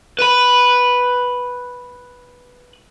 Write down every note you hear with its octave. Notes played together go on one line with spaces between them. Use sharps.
B4 B5